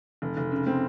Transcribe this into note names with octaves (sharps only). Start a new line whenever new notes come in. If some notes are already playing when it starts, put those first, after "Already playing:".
F1
F1
C#3
C4